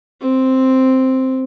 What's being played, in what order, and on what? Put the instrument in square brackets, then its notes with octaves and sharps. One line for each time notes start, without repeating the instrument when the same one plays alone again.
[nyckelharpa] C4